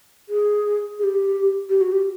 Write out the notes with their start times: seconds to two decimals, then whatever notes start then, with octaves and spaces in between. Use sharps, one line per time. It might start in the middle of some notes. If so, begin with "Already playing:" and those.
0.29 G#4
0.99 G#4
1.03 G4
1.69 G4
1.81 F#4
1.92 G4